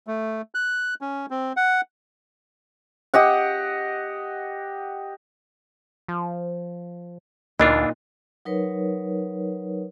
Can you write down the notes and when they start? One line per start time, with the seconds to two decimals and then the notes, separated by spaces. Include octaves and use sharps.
0.07 A3
0.55 F#6
1.01 C#4
1.30 C4
1.57 F#5
3.14 G4 D#5 F#5
6.08 F3
7.60 D2 A#2 E3 D4 D#4 F4 D#5
8.45 F#3 D#4 A#4 B4 C#5